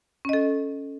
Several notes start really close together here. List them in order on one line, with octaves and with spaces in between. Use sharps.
C#4 D#5 A4